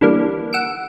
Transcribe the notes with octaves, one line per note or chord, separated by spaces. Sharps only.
D3 E3 G3 A#3
F#5 E6 C#7 D7